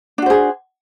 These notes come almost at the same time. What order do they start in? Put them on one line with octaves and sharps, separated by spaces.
D4 F#4 C5 G#4